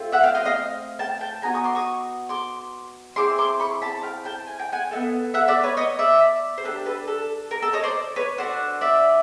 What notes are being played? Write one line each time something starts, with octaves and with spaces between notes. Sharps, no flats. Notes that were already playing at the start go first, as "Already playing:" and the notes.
Already playing: A3 C4 F4
E5 F#5
F5 G5
D#5 F5
D#5 F5
G5 A5
G5 A5
B3 D#4 F#4 G#5 A#5
C#6 D#6
C6 D6
C#6 D#6
C6 D6
C4 E4 G#4 C6 D6
C6 D6
B5 C#6
A5 B5
F5 G5
G5 A5
G#5
G5
F#5 G#5
B3 E4 A4
E5 F#5
D5 E5
B4 C#5
C#5 D#5
D5 E5
C5
D4 G4 A4 B4
A4 B4
A4
A#4
A4
C#5 D#5
C5 D5
B4 C#5
D4 F#4 A4 C5 D5
D5 E5